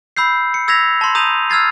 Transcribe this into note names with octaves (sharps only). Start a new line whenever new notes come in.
B5 E6 G6 C7
C#7
E6 G#6 A#6 B6 F7
A5 C6
A#5 D#6 G6 D#7 F7
E6 F6 G#6 A6 C7